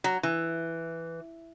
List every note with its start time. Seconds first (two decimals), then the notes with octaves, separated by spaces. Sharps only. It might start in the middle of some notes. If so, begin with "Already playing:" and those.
0.04 F#3
0.23 E3